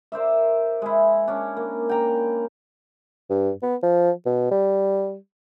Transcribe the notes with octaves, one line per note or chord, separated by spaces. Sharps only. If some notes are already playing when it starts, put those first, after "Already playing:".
A#4 C5 D5 E5
G#3 E4
C#4 D4
A#3
G5 A#5
G2
B3
F3
B2
G3